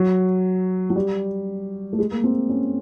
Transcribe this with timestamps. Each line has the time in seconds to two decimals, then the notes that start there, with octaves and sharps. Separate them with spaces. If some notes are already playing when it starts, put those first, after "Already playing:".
Already playing: F#3
0.90 F#3
0.96 G3
1.93 A3
1.99 G#3
2.12 A#3
2.24 C4
2.49 C#4